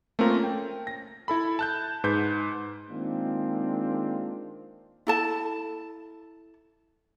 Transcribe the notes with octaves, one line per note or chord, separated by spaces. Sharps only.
A3 A#3 C4 C#4 F4 A#4
G5
A#6
E4 A4 B5
A5 F#6 G6
G#2 B4 G6
D#3 G#3 A#3 C4 D4 F4
E4 A4 A5